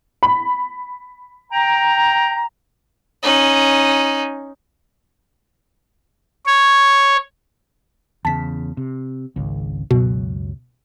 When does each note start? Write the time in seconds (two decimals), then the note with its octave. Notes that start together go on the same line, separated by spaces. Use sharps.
0.23 B5
1.52 G5 A#5
3.23 C#4 D#4
6.46 C#5
8.25 E2 C#3 A5 B6
8.77 C3
9.36 G#1 C#2
9.91 C#2 F#2 B2 F#3